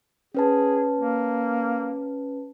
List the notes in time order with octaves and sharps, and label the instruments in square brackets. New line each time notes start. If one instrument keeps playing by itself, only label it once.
[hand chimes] C#4 B4 A5 [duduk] G#4
[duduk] A#3